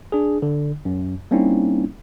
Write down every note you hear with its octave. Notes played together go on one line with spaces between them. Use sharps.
D4 G#4
D3
F#2
G3 A#3 C4 C#4 D#4 E4